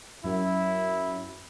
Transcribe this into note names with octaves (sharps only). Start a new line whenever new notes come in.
F#2 E4